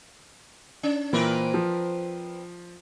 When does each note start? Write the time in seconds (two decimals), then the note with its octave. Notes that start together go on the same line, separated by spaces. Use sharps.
0.83 C#4
1.13 A#2 E3 C4 E4 A#4 B4
1.54 F3